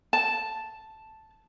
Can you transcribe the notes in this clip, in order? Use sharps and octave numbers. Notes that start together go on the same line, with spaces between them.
A5